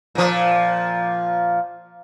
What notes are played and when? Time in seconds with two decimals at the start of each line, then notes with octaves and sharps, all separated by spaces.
0.15 A#2 F3